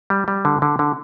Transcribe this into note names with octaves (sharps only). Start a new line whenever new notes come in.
G3
G3
D3
D3
D3